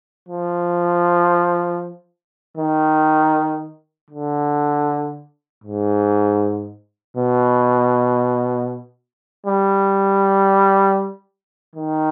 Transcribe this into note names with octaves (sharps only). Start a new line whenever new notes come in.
F3
D#3
D3
G#2
B2
G3
D#3